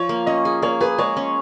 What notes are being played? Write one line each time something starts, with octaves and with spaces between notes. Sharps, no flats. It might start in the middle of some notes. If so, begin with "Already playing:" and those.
Already playing: F3 C#5
A#3
C#4 D#5
G#4
A#3 C#5
G#4 B4
G#3 C#5
C#4